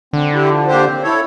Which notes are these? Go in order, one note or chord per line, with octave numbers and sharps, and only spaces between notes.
D3 C4
E4 G4
F3
A#3 D4 G4 C5
C4
E4 A4 C#5